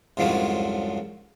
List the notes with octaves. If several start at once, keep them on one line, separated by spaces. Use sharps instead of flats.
C2 F2 G#2 C#3 F3 F#3